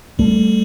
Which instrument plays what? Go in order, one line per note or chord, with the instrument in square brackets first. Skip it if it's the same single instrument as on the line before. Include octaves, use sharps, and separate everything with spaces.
[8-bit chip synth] G3 [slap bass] A3